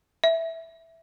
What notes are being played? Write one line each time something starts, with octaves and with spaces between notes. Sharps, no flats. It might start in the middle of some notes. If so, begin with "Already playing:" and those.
E5